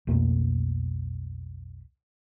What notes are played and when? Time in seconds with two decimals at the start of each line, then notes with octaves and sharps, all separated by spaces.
0.07 B1 F2 A3 A#3